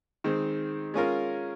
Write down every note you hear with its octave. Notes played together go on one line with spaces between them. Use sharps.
D#3 G#3 C4
G#3 C#4 F4 A#4